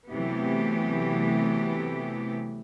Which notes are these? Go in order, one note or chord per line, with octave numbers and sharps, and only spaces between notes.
C3 E3 F#3 A3 B3 G4